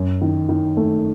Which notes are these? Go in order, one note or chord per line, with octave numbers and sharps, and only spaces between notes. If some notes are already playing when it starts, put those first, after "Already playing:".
Already playing: F#2
D#3
D#3
A3